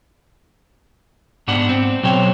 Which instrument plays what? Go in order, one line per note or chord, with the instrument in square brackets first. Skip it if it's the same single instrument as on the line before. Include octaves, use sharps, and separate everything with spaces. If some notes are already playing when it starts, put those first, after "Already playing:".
[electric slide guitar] G#2 B3 D4 G4 F#5
C4
B2 F#3 C5 C#5 G5